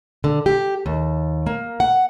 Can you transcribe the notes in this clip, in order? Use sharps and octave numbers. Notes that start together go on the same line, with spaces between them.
D3
G4
D#2
A#3
F#5